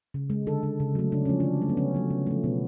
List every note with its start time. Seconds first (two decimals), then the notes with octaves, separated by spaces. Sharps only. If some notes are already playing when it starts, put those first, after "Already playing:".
0.14 C#3
0.30 G#3
0.47 D3 A4
0.63 G#3
0.80 C#3
0.95 F#3 A3
1.12 C#3 D4
1.25 F3 G#3 C#4
1.40 D3 D4
1.61 F#3 A3
1.69 B3
1.77 C#3 C#4
1.95 F#3 A3
2.10 C#3
2.27 F3 A3
2.44 B2 B3